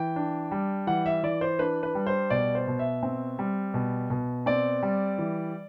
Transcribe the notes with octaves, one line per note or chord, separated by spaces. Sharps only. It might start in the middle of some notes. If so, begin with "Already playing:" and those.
Already playing: E3 G5
D4
G3
E3 F#5
E5
E3 D5
C5
D4 B4
B4
G3
C5
B2 D5
C5
B2
E5
C4
G3
B2
B2
C4 D5
G3
E3